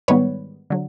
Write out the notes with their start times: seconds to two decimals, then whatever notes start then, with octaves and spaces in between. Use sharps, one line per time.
0.08 G#2 D#3 G3 B3 B4 C#5
0.70 D3 F#3